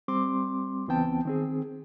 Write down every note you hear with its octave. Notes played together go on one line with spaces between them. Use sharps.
G3 C4 C6 D6
C#2 E3 B3 C4 G5 A5
D#3 C4 G#4